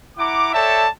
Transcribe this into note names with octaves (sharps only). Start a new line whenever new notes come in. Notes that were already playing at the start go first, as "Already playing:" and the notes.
E4 F#5 A#5 D6
A4 C#5 D5 E5 G5 A5